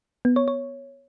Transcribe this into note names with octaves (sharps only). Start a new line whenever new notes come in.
B3
C#5
C#5